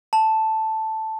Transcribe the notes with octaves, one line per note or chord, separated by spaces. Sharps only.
A5